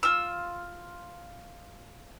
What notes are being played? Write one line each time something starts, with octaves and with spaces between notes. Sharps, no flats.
F4 E6